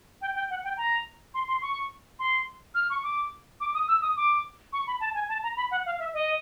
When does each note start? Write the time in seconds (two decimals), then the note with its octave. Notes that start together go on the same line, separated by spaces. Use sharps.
0.21 G5
0.35 G5
0.50 F#5
0.64 G5
0.77 A#5
1.34 C6
1.48 C6
1.62 C#6
2.19 C6
2.75 F6
2.90 C#6
3.03 D6
3.60 D6
3.74 D#6
3.88 E6
4.02 D#6
4.17 D6
4.73 C#6
4.87 B5
5.00 A5
5.14 G#5
5.29 A5
5.43 A#5
5.57 B5
5.71 F#5
5.86 F5
5.99 E5
6.14 D#5